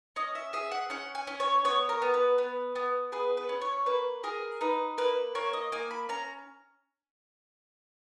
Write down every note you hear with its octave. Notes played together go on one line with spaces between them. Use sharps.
C#4 D#5
E5
G#4 E5
F#5
C#4 F#5
G#5
C#4
C#5
B3 C#5
A#4
B3
B4
B3
B3
G#4 B4
B4
C#4
C#5
A#3 B4
G#4 A#4
D#4 B4
A#3 B4
A#3 C#5
D#5
A#3 G#5
B5
C#4 A#5